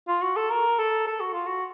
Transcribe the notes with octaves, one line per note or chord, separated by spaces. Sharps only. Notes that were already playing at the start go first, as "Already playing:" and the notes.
F4
F#4
A4
A#4
A4
A4
F#4
F4
F#4